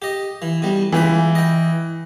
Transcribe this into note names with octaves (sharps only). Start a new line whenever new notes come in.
G4 D#5
E3
B2 G3
C#2 E3 G5 B5
D#5 G5